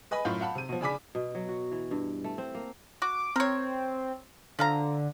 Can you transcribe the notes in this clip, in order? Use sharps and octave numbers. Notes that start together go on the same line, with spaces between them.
B4 D#5 G#5 B5
F#2 A2 F4 B5 G6
F5 F#5 A5 B5
C3 D#7
B2 F3
C#3 D4 G#5 B5 D6 B6
B2
F#3
F#4
E3
G2
A3
C4
A#3
F#4 D6
C4 A#4 C#5
D3 F3 F5 A#5